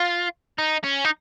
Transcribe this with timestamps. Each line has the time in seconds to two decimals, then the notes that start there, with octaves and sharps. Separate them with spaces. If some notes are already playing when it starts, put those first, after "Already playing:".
Already playing: F4
0.58 D#4
0.84 C#4
1.05 D#4